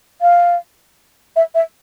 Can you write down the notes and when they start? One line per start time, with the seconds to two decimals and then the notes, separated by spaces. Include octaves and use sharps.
0.22 F5
1.36 E5
1.55 E5